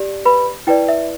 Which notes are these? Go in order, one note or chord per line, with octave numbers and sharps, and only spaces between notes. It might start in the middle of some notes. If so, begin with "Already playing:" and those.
Already playing: G4 D5
B4 B5
E4 B4 D5 G5
E5